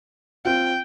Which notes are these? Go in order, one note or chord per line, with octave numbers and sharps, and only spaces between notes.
C4 F4 G5